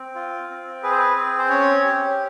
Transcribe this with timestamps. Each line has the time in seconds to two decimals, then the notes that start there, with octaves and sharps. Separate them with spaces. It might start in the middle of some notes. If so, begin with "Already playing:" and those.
Already playing: C4
0.15 F4
0.50 C4
0.83 G#4 B4
0.91 C5
0.98 B4
1.16 C4
1.38 C5
1.49 C#4 C#5
1.84 G4